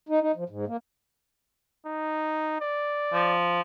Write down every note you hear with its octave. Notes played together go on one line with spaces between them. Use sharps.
D#4
D#4
F3
G#2
A#3
D#4
D5
F3